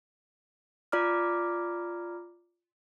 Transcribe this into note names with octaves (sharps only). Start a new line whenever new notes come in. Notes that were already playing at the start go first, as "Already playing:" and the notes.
F4 D5 A#5 D6 F6